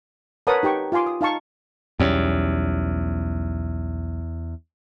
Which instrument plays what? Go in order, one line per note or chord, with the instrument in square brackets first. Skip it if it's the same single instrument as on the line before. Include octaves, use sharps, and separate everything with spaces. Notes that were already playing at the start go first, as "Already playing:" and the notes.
[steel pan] A#4 B4 C#5 F#5 A5 D#6
D#4 G4 G5 C#6
F4 F5 G#5 C6 D6
D#6
D#4 F5 A5 C#6
[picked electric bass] B1 G3 C#4 [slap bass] E2